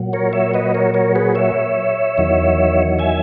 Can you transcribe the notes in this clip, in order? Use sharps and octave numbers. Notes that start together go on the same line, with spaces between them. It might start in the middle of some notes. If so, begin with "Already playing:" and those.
Already playing: A#2 F#3
A#4 C#5
C#5 E5
B4 D#5
A#4 C#5
A#4 C#5
G#4 B4
C#5 E5
E2 D#3 F#3
E5 G#5